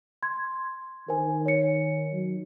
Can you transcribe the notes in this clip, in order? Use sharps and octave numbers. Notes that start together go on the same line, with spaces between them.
C6 G#6
D#3 A#4 C5 G#5
C#5 C#7
F#3